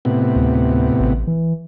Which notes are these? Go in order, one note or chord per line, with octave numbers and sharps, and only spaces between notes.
A2 C3 B3
D2
A1
E3